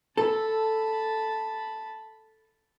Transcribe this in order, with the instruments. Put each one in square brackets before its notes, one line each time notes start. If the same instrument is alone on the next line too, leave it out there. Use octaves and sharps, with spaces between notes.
[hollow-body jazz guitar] A4 [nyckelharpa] A5 B5